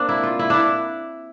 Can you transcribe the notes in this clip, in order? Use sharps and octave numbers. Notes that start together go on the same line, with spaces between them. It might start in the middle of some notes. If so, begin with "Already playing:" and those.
Already playing: A#3 C4 D4
E4
F4
E4
D4 E4